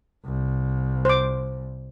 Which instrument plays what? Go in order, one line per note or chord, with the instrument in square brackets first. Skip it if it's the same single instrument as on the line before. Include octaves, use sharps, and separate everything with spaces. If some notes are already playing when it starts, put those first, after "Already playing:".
[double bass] C2
[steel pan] C5 D6